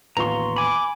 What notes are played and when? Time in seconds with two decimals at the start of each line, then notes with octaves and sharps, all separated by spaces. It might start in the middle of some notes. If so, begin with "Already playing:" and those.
0.17 A1 D#2 B3 F4 A#5 C6 C#6
0.56 G#5 B5 D6